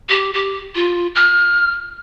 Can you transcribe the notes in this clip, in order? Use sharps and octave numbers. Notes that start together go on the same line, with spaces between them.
G4
G4
F4
F6